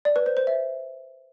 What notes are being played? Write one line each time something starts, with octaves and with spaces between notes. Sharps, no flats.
D5
B4
C5
C5
E5